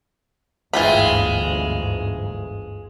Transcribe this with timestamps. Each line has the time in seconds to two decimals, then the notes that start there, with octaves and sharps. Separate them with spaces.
0.73 G1 D2 G#2 E3 G#3 F4 G5 B5